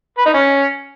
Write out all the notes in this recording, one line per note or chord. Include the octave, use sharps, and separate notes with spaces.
B4
D#4
C#4